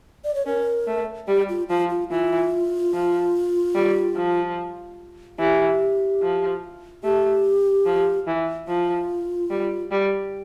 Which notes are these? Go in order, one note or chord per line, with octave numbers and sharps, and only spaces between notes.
D5
C#5
C#4 A#4
A3
G3 G4
F4
F3 F4
F4
E3 F4
F3
G3
F3
E3 G4
F3
A3 G4
F3
E3
F3 F4
G3
G3